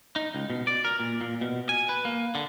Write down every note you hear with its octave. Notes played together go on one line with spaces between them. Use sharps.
D#4
C#2
B2
D5
A#4
A#2
A#2
B2
G#5
B4
A#3
D3